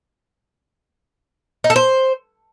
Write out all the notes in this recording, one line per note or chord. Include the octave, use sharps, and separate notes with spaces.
D#4
A4
C5